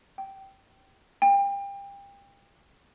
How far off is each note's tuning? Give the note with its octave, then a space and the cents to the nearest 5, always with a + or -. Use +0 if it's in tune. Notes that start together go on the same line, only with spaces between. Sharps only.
G5 -20
G5 +30